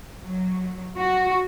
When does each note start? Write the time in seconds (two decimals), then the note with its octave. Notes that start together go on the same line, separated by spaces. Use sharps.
0.24 F#3
0.98 F#4